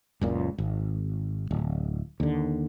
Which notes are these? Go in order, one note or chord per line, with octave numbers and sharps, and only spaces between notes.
F#1 C#2 A#2
G#1
D1
D#2 D3